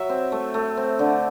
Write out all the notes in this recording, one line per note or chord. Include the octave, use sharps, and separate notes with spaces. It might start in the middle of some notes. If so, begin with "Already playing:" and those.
Already playing: F#3 E5
C4
A3
A3
C4
D3